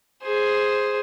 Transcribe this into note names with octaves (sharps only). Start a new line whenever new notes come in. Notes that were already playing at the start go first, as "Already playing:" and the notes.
G#4 C5